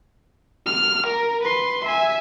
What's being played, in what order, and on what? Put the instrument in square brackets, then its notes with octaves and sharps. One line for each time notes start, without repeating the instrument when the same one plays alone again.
[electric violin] F6
A#4
B4 C6
E5 G#5